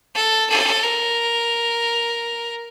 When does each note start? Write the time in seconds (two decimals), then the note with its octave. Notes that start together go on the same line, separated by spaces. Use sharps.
0.15 A4
0.50 A4
0.84 A#4